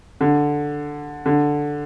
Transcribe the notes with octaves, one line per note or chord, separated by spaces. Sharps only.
D3
D3